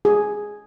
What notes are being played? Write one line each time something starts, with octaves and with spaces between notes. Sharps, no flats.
G#4